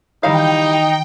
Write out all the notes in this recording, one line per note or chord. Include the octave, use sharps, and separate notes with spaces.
D#3 E3 G3 D#4 E4 F#4 F5 G5